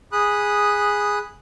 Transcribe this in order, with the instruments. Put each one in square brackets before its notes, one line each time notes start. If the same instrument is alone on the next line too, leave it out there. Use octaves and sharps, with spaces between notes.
[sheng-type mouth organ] G#4 B5 D#6 F#6